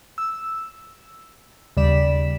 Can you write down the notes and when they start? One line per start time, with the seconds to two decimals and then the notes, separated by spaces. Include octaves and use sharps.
0.18 E6
1.77 D#2 C#3 G3 D5 B6 E7